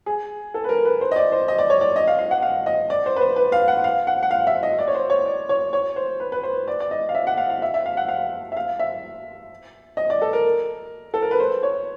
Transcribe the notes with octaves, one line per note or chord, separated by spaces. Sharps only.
G#4
A4
B4
A#4
B4
C5
D#5
D5
C5
D#5
D5
C#5
D5
D#5
F5
F5
F#5
F5
D#5
D5
C5
B4
C5
B4
F5
F#5
F5
F#5
F#5
F5
E5
D#5
D5
C#5
C5
C#5
D5
C#5
C#5
C5
B4
B4
C5
D5
D5
D#5
F5
E5
F#5
F5
F5
E5
E5
F5
F#5
F5
E5
F5
E5
D#5
D5
A4
A#4
A4
A#4
B4
C5
C#5